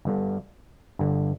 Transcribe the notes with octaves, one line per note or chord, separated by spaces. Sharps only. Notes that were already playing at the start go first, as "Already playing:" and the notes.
G1 G2 D3
G1 G2 D3